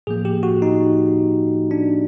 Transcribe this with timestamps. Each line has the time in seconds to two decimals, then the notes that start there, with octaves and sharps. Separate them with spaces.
0.07 A2 F3 A#3 G#4
0.25 G4
0.43 F#4
0.62 D#4
1.71 D4